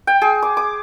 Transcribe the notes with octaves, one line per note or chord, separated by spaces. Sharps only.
G5
G#4
D6
D6